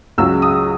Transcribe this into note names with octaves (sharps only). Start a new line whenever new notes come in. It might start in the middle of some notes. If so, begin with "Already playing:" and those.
C#2 C#3 F#3 E6
D#6